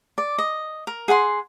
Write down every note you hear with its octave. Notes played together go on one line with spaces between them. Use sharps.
D5
D#5
A#4
G#4 F#5 G#5 C6